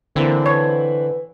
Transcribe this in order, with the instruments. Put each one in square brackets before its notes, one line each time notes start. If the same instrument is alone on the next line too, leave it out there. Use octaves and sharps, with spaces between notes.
[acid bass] D3 [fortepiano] E3 C4 E4 [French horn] A#3
[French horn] B4 [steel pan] C#5